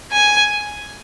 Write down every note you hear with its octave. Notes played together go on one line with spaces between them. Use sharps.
G#5